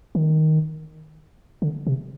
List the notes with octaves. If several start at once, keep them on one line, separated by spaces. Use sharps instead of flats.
D#3
D3
C3